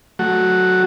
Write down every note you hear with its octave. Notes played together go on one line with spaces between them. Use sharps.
F#3 A3 F#4